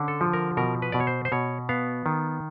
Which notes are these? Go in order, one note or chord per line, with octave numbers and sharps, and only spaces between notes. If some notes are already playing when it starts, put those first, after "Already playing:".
Already playing: D3 C#4
A4
F3
A#4
B2 A#4
B4
B2 D5
C#5
C5
C5
B2 C#5
B3 F5
D#3